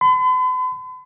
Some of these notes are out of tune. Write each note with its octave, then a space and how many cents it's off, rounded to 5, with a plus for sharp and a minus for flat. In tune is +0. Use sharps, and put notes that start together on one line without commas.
B5 +45